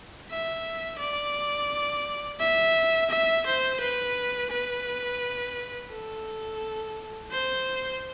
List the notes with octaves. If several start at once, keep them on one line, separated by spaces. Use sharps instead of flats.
E5
D5
E5
E5
C5
B4
B4
A4
C5